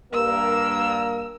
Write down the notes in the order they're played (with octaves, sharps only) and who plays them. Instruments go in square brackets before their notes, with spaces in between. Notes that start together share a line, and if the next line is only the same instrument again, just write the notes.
[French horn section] G2 A#3 A#4 [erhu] E6